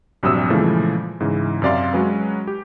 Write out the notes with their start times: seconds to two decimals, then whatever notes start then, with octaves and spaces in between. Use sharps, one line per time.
0.23 A#1 G2 C3 F#3 D#6 E6
0.50 A#2 C#3 E3 F3 G#3 A3
1.20 G#2 C#3 E3
1.62 F#2 C3 D5 F5 C6
1.93 F#3 G#3 C#4 B4
2.47 G4